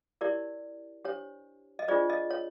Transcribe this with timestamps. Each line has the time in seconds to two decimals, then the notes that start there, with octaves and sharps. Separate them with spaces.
0.21 E4 G4 A#4 C#5 D5
1.05 D4 G4 C5 C#5
1.79 D#5
1.88 D4 F4 G#4 C5 D5
2.10 D#5
2.31 C#5